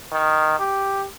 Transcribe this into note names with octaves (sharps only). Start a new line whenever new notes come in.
D#3
G4